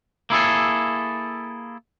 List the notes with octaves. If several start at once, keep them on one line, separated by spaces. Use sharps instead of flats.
A#3 E4 G#4 A4